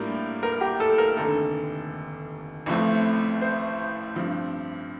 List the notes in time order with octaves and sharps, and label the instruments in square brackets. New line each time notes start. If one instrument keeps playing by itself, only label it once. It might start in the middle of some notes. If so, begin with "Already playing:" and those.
Already playing: [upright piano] A2 G3 A#3 D4 F4 [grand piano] A#4
[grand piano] A#4
G4
A4
A#4
[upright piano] F1 D#2 D3 [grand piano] A4
[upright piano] A1 A2 F3 A3 C4
[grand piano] C5
[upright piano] G2 F3 C4